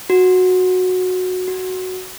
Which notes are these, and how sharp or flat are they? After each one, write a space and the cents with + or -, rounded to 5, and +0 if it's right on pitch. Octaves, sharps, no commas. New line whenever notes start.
F#4 -10
F#4 +5